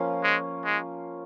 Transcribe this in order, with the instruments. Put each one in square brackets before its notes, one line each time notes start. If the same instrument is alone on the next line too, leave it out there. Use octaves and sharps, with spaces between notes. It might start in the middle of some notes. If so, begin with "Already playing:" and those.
Already playing: [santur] F3 A#3 C#4 F4
[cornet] G#3
G#3